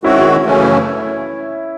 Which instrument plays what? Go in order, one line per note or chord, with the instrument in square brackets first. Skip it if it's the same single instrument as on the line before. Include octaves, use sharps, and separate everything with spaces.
[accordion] D#3 G#3 C4 F#4 [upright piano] C#4 E4
[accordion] F#2 C#3 E3 A3 C#4